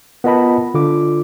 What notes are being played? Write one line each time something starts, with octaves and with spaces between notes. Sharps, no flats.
B3 F4 A#4 D#5 A5 B5
D3 F4 D6